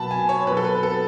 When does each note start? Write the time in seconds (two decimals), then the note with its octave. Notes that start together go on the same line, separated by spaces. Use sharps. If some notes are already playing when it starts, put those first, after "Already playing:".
Already playing: B2 F#3 A5 B5
0.11 G#5
0.29 C#5
0.47 B2 F#3 B4
0.57 A4
0.65 B4
0.75 B4
0.83 A4